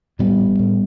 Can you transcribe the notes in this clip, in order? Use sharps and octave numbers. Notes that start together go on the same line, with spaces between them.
A2 G3 B3
A1
A2